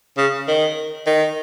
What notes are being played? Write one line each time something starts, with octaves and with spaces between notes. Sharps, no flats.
C#3
D#3
D#3